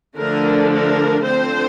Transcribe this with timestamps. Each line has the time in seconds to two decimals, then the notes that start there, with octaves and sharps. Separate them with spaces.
0.18 D3 F3 A3 D4 A#4
0.72 A#4
1.25 D3 F3 C4 C5